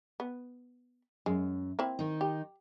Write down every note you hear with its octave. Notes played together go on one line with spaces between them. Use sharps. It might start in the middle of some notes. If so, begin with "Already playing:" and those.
B3
F#2 G#3
A#3 C4 E4
D#3 D#4
G4